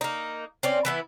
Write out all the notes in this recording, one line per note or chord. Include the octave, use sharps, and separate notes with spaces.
A#3 D#4
C4 C#4 D5
E3 B3 E4